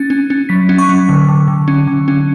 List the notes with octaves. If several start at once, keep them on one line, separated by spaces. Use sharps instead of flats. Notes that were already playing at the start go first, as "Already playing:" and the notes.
Already playing: C#4 A6
C#4
C#4
F#3 B6
C#4
C#6
F#3
D3
D3
D3
C#4
D3
C#4